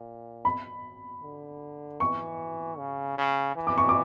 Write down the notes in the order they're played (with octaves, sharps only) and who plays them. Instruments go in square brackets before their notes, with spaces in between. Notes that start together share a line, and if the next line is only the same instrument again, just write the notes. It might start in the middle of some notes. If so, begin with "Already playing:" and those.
Already playing: [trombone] A#2
[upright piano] B5
[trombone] D3
[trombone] E3 [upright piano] C#6
[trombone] C#3
C#3
E3
[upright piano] D6
C#6
D6